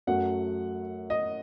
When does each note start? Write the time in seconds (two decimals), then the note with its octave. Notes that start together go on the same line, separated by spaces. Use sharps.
0.07 F#2 F#3 A3 F#5
1.10 D#5